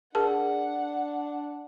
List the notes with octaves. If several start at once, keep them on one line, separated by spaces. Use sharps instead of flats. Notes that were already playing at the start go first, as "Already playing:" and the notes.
D4 G#4 A#4 F#5 A5